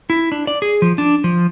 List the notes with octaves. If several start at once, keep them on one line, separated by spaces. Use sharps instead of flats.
E4
D4
D5
G#4
F3
D4
F3